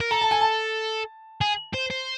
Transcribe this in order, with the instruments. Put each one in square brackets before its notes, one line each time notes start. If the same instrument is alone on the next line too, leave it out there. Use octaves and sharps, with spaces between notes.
[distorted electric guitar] A#4
[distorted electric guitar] A4 [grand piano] A#5
[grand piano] A5
G#5
A5
[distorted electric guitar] G#4
C5
C5